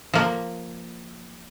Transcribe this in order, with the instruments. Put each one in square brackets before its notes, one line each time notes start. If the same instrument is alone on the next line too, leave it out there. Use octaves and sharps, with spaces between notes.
[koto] F3 A#3